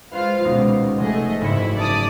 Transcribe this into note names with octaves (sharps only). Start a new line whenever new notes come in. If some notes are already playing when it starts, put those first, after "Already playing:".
G#3 F4 B4 C5 F5
D#1 C#2 B2 D#4 D#6
F1 A3 G#4 D#5
F#1 G#2 E4 C#7
C#4 D5 A5 D#6